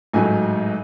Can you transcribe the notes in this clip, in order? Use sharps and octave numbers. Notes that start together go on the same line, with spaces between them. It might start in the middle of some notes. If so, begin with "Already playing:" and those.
A1 G#2 F#3 A3 G#5